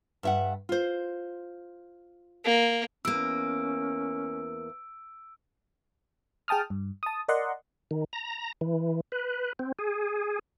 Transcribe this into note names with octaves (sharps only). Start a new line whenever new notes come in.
G2 E5 F#5
F4 C5
A#3
E2 A#3 C#4 E6 D7
G#4 G5 A5 D#6 F6
G2
A5 D#6
A#4 D5 D#5 F#5 C6
D#3
A#5
E3
B4
C4
G#4